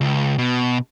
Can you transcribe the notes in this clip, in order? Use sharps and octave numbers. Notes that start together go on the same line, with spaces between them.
C#2
B2